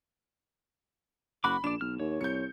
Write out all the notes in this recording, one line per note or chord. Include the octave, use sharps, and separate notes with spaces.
F#1 F#4 F#5 B5 D6
A#1 D4 D5 E7
B1 F6
D#2 C#5
C2 G6 C#7